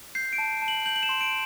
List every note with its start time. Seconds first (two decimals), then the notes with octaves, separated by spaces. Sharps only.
0.15 G6 C7
0.33 D7
0.38 A5
0.62 A5
0.68 F#7
0.86 G6 F#7
0.96 F#7
1.03 E7
1.09 C6
1.21 D7